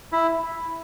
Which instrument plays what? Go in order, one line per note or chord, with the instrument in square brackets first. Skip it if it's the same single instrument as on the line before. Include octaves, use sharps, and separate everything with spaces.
[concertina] E4